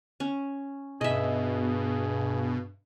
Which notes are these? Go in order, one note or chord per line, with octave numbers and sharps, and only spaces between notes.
C#4
G2 B2 G#4 D#5 E5